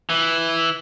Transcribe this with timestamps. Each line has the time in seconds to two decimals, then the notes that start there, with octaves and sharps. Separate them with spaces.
0.10 E3